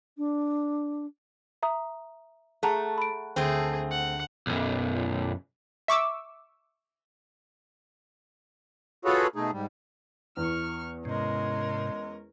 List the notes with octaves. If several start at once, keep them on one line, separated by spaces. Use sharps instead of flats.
D4
E5 A#5 D#6
A3 G#4 F#5 A5 A#5
B5 D7
D2 A3 C4 G#4
F#5
B1 F#2
E5 C#6 D6 E6
F4 F#4 G#4 A4 B4 C#5
B2 A3 D#4 G#4
G#2 G3
E2 C#6 F6
G#2 C3 G#3 C#4 A#4